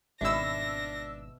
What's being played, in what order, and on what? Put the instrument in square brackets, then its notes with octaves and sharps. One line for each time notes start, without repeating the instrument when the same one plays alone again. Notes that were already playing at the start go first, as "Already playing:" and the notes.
[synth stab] G#1 E6 [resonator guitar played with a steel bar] B2 E5 [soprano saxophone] D4 [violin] A#6